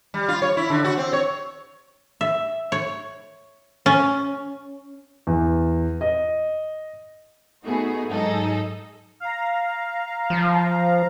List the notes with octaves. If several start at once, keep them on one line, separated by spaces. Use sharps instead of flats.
G3
F4
C#5
E4
D3
F#4
C4
C#5
E5
C#5
C#4
E2
D#5
A3 B3 D#4 F#4 G#4
G#2 F#3 D#4 G#4 A4 D#5
F5 A#5
F3